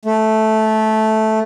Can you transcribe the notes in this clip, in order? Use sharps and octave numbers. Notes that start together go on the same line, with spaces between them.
A3